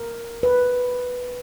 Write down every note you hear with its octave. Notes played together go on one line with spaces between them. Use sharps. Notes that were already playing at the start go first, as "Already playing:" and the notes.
Already playing: A#4
B4